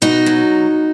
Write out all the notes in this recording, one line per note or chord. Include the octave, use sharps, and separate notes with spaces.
B2 D#4 F#4
F#3